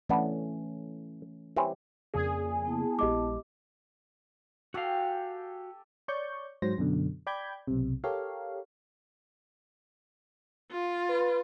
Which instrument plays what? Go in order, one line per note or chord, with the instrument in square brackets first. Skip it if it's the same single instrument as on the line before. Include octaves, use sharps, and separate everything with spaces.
[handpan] E3 A3 C#4 [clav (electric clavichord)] B3 D4 E4
[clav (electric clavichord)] E3 C4 C#4 [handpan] G4
[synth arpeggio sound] F2 C#3 A#3 [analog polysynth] G#4 [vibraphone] D5
[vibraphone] B3 E4 A5
[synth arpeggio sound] A#1 G#3 [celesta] G4 D#5 D6
[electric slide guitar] F#4 F5 [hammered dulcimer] G4 A4 G#5
[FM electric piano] C#5 D5 C#6 G6
G#2 F#3 C5 A#6
F#2 B2 D3
D5 G5 B5 G6 G#6
B1 C3
G4 A4 A#4 C#5 F5
[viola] F4
[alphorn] B4